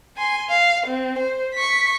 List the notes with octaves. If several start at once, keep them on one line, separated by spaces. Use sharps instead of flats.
G#5 C6
F5
C4
C5
C#6 B6